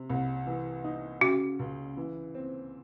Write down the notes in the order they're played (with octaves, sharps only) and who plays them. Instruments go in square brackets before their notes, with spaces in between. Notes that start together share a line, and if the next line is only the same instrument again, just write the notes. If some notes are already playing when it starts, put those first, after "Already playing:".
Already playing: [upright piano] C3
C2
E3
D#4
[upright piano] C#3 [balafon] F#4
[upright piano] C#2
E3
C4